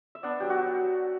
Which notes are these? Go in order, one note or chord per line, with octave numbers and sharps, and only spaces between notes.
E5
B3 D4 D5
F#3 G4
F#4
F#3